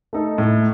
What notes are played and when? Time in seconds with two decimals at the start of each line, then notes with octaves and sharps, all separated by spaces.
0.13 A3 D#4 A4
0.38 A2